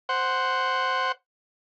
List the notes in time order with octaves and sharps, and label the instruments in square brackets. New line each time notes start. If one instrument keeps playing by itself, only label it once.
[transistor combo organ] C5 F#5